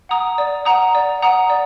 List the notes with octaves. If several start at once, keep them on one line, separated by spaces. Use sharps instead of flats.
F#5 A#5 D#6
D5
F#5 A#5 D#6
D5
F#5 A#5 D#6
D5